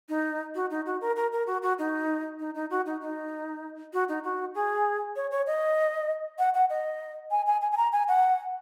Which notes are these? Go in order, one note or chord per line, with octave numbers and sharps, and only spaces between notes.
D#4
F#4
D#4
F#4
A#4
A#4
A#4
F#4
F#4
D#4
D#4
D#4
F#4
D#4
D#4
F#4
D#4
F#4
G#4
C#5
C#5
D#5
F#5
F#5
D#5
G#5
G#5
G#5
G#5
A#5
G#5
F#5